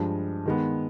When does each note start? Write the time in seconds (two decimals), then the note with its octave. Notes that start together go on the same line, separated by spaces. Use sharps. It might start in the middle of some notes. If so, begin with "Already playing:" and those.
Already playing: G2 F3 G#3
0.46 D#3 G#3 B3